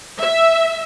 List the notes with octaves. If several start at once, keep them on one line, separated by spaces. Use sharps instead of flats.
E5